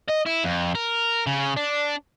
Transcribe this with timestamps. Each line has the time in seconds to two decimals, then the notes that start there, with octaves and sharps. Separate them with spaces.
0.09 D#5
0.26 E4
0.44 F2
0.75 A#4
1.27 C#3
1.56 D4